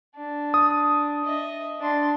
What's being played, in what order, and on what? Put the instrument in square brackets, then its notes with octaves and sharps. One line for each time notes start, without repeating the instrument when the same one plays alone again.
[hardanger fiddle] D4
[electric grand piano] D#6
[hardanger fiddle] D#5 E5
D4 C6